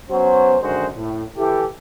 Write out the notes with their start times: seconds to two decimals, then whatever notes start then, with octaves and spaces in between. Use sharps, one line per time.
0.10 F#3 B3 C#4 C5
0.61 F#2 D3 D#3 G#3 F#4 C5
0.96 A2
1.37 E3 G4 A4